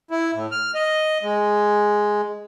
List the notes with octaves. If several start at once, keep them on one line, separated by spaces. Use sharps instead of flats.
E4
A2
F6
D#5
G#3